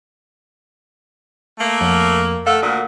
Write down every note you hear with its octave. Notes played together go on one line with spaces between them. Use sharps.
A3 A#3
F2
A3 A4 F5 F#5
D2 A#2